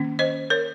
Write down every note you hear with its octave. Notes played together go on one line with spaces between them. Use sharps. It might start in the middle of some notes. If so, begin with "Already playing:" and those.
Already playing: D#3 A#3 C#4
C5 D#5
A#4 C#5